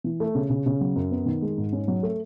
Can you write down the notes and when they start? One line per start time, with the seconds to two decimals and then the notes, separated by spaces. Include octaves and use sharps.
0.04 E3
0.20 A3
0.35 C#3
0.50 C#3
0.66 C#3
0.81 F#3
0.96 F#2
1.11 B3
1.26 D#3
1.42 G#3
1.58 G#2
1.73 C#4
1.88 F#3
2.03 A3